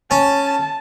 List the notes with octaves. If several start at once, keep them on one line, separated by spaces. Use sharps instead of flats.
C#4 A5